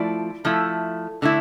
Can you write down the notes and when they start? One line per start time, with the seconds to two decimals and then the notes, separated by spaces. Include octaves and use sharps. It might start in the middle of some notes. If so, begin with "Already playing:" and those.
Already playing: F3 A3 E4 D5
0.45 F3 A3 E4
1.22 D3 A3 E4